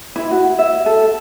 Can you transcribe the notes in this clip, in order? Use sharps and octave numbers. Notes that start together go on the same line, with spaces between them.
E4
F#4
E5
A4